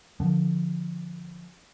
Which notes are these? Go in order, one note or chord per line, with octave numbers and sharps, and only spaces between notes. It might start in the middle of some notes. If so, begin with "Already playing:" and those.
D3 F3